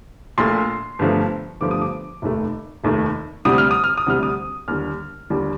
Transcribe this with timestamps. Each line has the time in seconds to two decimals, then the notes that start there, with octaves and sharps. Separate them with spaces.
0.38 A#1 A#2 A3 C6
0.99 G1 G2 D3 F3 A3
1.60 G1 G2 D3 F3 A3 D6
1.71 D#6
1.81 D6
2.22 F1 D#2 D#3 A3
2.84 F1 D#2 D#3 A3
3.45 D2 C3 G3 D#6
3.58 F6
3.71 D#6
3.84 F6
3.97 D#6
4.06 D2 C3 G3 F6
4.23 D#6
4.68 D#2 D3 G3 F6
5.30 D#2 D3 G3